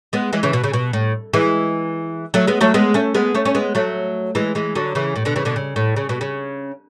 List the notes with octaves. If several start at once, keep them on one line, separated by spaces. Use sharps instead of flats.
G#3 B3
E3 G#3
C#3 E3
B2
C#3
B2
A2
E3 G#3
F#3 A3
G#3 B3
F#3 A3
G#3 B3
A3 C#4
G#3 B3
A3 C#4
C#4
G#3 B3
F#3 A3
E3 G#3
E3 G#3
D3 F#3
C#3 E3
A2
B2 D3
C#3 E3
B2 D3
C#3
A2
C#3
B2
C#3